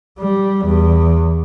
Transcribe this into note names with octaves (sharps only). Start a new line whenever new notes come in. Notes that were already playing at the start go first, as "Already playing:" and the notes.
G3
E2